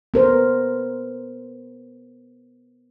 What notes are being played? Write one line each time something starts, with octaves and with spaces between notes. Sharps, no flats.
B3 A#4 C5